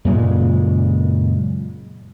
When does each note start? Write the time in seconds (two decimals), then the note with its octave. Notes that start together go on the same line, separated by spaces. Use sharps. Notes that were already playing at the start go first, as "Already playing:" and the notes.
0.05 F#2 A#2 C#3 G#3